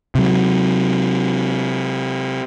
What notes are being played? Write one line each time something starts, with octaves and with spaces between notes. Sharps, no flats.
C3 F#3